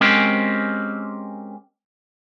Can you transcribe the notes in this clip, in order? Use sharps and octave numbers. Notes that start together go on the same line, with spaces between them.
G#3 C4 C#4 G4 A#4 C5